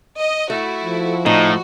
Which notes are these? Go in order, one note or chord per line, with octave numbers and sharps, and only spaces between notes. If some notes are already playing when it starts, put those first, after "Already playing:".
D#5
A3 E4 F#4
F3
A2 D#4 F#4